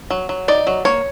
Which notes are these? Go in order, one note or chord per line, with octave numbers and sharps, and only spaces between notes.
F#3
F#3
D#4 D5
F#3
A#3 C#5